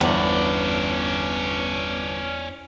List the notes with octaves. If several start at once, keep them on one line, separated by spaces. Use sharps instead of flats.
G1 E2 C#4 D5